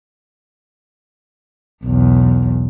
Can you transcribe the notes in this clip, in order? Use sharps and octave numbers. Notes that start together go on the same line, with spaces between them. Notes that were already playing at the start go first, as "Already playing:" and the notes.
B1 E2